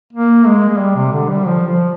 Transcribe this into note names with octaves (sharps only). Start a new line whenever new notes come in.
A#3
G#3
G#3
G3
C3
D3
G3
F3
F3